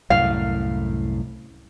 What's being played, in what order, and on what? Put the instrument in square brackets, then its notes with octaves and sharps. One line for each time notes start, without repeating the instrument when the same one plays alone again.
[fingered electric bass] C2 F#2 A2 [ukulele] F5